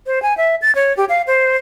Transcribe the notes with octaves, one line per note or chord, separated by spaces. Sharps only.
C5
G#5
E5
A6
C#5
G4
F5
C5